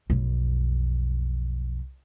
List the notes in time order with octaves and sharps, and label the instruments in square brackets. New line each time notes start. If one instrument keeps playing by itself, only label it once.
[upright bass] B1 F2